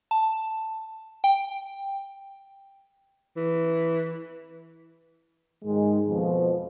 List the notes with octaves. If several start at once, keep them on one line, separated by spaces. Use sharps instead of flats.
A5
G5
E3
G#2 D#3 G#3
F2 B2 F3